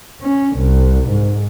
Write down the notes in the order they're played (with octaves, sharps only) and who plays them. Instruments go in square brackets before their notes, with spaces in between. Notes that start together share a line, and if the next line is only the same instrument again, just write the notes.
[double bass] C#4
C2
G#2